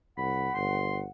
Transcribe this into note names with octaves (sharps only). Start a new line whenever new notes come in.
C2 F#5 B5
G1 C6